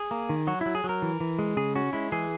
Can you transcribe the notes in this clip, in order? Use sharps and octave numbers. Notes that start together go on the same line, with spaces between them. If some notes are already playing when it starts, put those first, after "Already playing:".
Already playing: G#4
A#3
D#3
F#3 F#4
F#3 E4
G#4
F#3
A#4
E3
E3
G#3
C#3 G#4
C#4 F#4
G#3 E4
E3 G#4